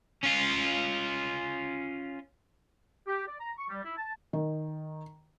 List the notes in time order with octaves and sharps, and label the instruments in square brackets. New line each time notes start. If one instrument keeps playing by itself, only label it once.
[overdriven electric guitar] C#4 F4
[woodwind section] G4
D5
A#5
C#6
G3
E4
A5
[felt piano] D#3